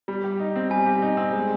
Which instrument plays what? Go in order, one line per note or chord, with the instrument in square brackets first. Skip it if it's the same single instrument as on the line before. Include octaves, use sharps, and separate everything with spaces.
[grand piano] G3
G4
D#4
C4
[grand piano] G3 [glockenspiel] G#5
[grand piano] G4
D#4
C4
G#3